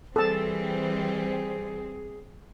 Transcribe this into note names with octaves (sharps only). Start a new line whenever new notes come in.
E3 G3 C4 G#4 A4 A5